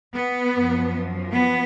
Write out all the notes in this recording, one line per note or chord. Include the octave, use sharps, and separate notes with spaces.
B3
F#2 F3
B3